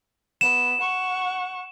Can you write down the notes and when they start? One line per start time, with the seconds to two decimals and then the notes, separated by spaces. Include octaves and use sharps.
0.41 B3 E7
0.81 F#5 C#6